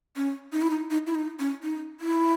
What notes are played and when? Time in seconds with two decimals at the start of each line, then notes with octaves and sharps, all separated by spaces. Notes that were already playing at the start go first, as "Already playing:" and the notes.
0.16 C#4
0.52 D#4
0.62 E4
0.70 D#4
0.90 D#4
1.07 E4
1.15 D#4
1.39 C#4
1.63 D#4
2.00 E4